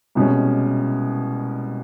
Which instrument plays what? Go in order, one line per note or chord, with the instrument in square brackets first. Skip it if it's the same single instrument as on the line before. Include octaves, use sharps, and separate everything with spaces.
[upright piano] C2 B2 G#3 C#4